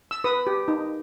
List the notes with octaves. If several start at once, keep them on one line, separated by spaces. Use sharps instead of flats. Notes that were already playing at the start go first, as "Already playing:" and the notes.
E6
B4 D#6
G4
D#4